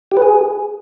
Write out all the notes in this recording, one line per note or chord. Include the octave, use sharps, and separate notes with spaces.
G4
B4
G#4